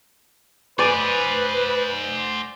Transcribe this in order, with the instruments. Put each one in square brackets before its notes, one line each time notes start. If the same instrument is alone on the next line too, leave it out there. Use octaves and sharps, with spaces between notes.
[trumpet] B4 [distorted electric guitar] C5 G#5 [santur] D5